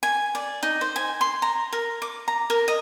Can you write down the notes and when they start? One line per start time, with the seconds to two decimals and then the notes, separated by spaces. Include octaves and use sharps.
0.03 G#5
0.35 D5
0.63 D#4
0.81 C5
0.96 G#5
1.21 C6
1.42 A#5
1.73 A#4
2.02 D6
2.28 A#5
2.50 A#4
2.68 D#5